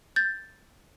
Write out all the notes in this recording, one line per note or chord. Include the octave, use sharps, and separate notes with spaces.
G6 A6